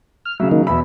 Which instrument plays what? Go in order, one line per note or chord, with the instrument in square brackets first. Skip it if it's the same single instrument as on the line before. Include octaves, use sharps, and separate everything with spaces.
[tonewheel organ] F6
[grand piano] C#3 F#3 [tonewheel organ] E5
[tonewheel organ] D#3 A#3 D#4
[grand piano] E2 B2 B5 [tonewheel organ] E5